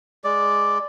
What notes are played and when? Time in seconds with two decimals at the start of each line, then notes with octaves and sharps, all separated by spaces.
0.24 G#3 D5